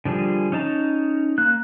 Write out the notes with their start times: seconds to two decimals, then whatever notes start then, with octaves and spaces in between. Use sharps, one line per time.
0.05 D3 F3 G3 G#4
0.52 C#4 D#4 A5 A#5
1.38 A#3 F#6